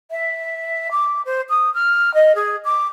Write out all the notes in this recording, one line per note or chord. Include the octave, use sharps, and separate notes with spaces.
E5
D6
C5
D#6
F6
D#5
G#4
D6